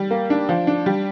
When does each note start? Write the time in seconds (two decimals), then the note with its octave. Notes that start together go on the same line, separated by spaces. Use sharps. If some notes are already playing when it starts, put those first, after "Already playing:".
Already playing: G3
0.11 A#3
0.30 D4
0.49 F3
0.67 D4
0.86 G3